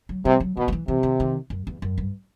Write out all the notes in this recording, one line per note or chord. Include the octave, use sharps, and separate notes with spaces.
F#3
C3 G3
F#3
B2 E3
F#3
E3
C3 E3
D#3
D#3
F#2
E2
F#2
G2